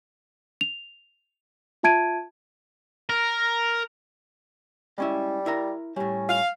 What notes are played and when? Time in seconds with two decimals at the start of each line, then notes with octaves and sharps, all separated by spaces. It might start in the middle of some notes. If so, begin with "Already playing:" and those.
0.61 F7
1.83 F4 E5 A5 G#6 D7 D#7
3.09 A#4
4.98 G3 G#3 C#4 E4
5.46 E4 A#4 A#5
5.96 A2 G3 C#4
6.30 F5